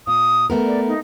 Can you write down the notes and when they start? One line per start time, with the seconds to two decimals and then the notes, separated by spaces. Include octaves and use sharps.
0.07 A#2 D#6
0.50 A3 B3 A#4
0.66 D5
0.87 D#4